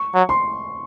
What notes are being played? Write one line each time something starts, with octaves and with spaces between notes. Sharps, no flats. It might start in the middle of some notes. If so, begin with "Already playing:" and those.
Already playing: C#6
F#3
C6